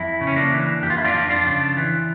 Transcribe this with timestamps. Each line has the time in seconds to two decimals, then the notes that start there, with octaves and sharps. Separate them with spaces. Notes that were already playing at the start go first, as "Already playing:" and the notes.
Already playing: F2 E4
0.21 C#3
0.27 C#4
0.36 A#3 D4
0.52 E3
0.82 F2 G4
0.90 F4
0.98 E4
1.05 D4 F4
1.14 F2
1.29 D4 F4
1.46 C#3
1.77 E3